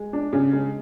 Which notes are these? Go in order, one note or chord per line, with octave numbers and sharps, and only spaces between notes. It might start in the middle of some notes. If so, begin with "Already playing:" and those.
Already playing: G#3
D4
C#3
G#3